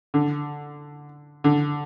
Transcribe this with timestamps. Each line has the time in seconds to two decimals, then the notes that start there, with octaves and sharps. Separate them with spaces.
0.14 D3
1.44 D3